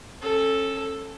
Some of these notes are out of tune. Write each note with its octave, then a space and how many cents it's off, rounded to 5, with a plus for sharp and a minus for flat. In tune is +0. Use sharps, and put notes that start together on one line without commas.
C#4 -30 A4 +0